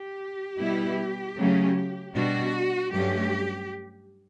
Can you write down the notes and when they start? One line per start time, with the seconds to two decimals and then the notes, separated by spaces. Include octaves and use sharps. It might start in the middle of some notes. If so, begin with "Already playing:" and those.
Already playing: G4
0.60 B2 G3 B3 E4
1.37 C#3 F#3 A3 C#4
2.15 B2 G3 D4 F#4
2.92 G2 F#3 A3 C#4 G4